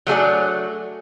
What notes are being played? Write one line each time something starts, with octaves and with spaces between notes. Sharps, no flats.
F#3 A3 D4 G#4 D5